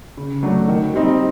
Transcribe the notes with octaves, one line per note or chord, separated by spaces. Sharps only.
C#3
F#3 A3 D4
D#3
G3 C4 D#4